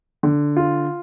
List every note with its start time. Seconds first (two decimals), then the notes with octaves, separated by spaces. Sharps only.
0.23 D3
0.57 F4